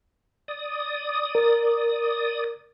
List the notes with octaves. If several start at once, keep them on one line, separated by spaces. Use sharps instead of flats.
D5 D#6
A#4